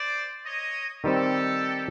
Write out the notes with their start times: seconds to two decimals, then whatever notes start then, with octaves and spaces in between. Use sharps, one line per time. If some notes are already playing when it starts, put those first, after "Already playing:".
Already playing: C5 D5
0.44 C#5 D#5
1.04 D#3 G3 C4 G4 A4